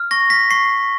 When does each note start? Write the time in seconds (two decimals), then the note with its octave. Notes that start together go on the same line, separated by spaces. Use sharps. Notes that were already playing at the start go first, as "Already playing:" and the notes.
Already playing: F6
0.11 C#6 A#6
0.30 B6
0.50 C#6 C7